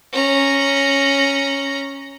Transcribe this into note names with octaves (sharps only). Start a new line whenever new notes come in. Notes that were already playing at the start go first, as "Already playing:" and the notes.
C#4 A#5